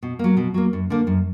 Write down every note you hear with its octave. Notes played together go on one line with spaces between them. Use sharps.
B2
F#3 A#3
B2
F#3 A#3
F#2
D3 A#3
F#2